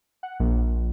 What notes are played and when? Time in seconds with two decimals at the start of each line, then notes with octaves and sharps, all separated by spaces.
0.23 F#5
0.40 A#1